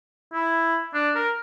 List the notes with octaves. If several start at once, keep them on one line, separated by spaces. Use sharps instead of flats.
E4
D4
A#4